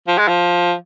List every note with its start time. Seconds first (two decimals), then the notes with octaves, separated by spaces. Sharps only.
0.08 F3
0.18 G#3
0.28 F3